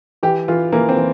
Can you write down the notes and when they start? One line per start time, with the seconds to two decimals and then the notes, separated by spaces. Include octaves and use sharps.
0.23 E3 G4
0.48 E3 F4
0.72 E3 A#3
0.89 C4
0.97 E3